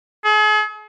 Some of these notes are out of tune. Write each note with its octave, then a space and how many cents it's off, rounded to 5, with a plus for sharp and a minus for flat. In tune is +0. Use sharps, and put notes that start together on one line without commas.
G#4 +45